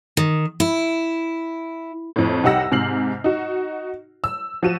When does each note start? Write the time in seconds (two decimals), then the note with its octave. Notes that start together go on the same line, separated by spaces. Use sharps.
0.17 D#3
0.60 E4
2.16 F2 A2
2.43 C2 D#4 G4 F#5 E6 A#6
2.71 G#2 C3 F6 C7 F#7
3.24 D#4 F#4
4.24 E6
4.63 F3 F#4 D#7 E7